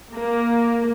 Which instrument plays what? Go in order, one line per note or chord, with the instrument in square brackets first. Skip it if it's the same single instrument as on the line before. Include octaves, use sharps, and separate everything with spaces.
[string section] A#3